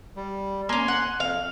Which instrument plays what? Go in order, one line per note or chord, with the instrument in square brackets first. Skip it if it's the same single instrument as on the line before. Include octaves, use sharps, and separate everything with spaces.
[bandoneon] G3
[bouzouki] A#3 C#4 [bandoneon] G#5 C6
[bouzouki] F#5
[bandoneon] F2 [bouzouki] F5